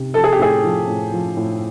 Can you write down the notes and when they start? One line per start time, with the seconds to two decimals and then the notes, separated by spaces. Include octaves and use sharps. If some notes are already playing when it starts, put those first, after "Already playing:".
Already playing: C3
0.14 F3 A4
0.24 G#4
0.33 G4
0.39 A2 G#4
0.64 F3
0.87 A2
1.13 F3
1.37 A2